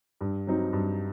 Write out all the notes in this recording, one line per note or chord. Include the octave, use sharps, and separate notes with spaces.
G2
F#3 C4 D#4
G2